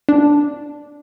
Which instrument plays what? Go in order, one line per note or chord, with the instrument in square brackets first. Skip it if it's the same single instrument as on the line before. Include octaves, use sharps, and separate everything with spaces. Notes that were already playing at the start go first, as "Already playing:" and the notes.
[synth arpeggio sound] D4